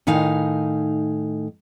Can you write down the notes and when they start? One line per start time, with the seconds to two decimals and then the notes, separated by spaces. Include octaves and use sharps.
0.07 A2 D#3 D#4 F5 G#5